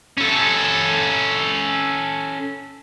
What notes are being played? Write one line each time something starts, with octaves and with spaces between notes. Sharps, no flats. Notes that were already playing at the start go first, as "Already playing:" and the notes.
C#4 A4